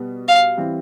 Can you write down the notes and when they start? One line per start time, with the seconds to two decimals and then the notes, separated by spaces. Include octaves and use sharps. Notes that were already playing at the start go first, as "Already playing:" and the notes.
Already playing: B2 G3 B3
0.28 F5
0.57 E3 G3 C4